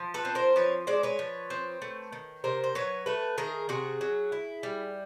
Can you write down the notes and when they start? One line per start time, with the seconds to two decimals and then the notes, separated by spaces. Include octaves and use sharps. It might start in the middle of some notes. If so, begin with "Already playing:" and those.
Already playing: F3
0.14 A4 B4
0.25 C4
0.35 A#4 C5
0.56 F3 B4 C#5
0.87 G#3 C5 D5
1.03 B4 C#5
1.19 F3
1.50 C4
1.82 A3
2.12 D#3
2.44 C3 A#4 C5
2.64 C5
2.75 F#3 B4 C#5
3.06 A3 A4 B4
3.38 D#3 G#4 A#4
3.69 C3 F#4 G#4
4.01 F#3
4.32 E4
4.63 G3